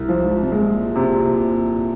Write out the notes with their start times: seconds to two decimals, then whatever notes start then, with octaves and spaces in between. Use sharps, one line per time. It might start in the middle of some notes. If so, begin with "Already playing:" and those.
Already playing: C2
0.09 F3
0.23 G#2
0.42 C3
0.52 A#2 G#3
0.96 C3